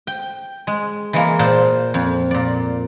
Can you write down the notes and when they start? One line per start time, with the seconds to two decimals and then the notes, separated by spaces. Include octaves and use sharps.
0.07 G5
0.67 G#3
1.13 E3 G#3 A#3
1.39 A#2 C5 A5
1.94 F2
2.31 A#2 D5